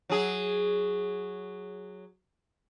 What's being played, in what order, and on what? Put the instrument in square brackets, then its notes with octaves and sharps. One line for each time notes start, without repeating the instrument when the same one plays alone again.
[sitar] F#3 G#4